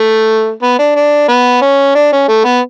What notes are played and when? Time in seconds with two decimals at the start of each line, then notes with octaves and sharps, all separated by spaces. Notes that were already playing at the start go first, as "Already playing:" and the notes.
Already playing: A3
0.62 B3
0.79 D4
0.96 D4
1.29 B3
1.61 C#4
1.95 D4
2.12 C#4
2.28 A3
2.44 B3